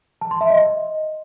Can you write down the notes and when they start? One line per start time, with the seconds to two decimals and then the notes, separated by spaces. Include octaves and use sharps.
0.21 A5
0.31 C6
0.41 E5
0.50 D#5